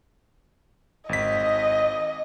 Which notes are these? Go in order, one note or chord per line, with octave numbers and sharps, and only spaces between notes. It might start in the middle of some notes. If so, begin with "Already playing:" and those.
G#1 D#5 B6